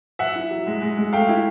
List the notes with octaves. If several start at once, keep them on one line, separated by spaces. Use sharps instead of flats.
F#3 E5 F#5
E4
F#3
G#3
G#3
G#3
A3 F5 G5
E4